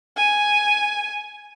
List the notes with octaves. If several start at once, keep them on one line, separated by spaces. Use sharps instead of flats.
G#5